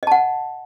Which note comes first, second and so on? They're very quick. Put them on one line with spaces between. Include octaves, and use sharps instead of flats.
D#5 A5 F#5